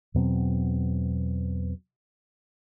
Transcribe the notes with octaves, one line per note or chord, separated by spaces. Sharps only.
E2 B2 F#3 C4